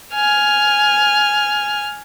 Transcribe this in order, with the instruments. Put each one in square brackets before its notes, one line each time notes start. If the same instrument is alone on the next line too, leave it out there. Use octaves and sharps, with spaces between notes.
[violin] G#5 F6